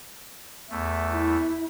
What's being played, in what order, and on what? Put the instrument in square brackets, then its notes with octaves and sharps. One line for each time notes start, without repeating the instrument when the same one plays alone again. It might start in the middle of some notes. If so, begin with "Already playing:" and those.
[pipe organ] E2 A3
[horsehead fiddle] E4